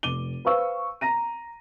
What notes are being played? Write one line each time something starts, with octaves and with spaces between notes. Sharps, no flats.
F1 D6 D#7 G7
B4 C5 F5 C#6 E6
A#5 A#6 D#7